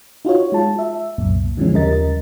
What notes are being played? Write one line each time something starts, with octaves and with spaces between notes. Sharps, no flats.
D#4 F4 F#4 C#5
G#3 F4 A5
E5
C2 F#2 A#2
D3 E3 F3 G#3 C#4
D#2 C#3 G3 A#4 D#5 A6